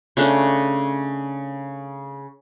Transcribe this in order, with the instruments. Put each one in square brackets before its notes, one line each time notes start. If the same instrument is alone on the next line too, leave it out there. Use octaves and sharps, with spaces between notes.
[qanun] C#3 A3 D4 A4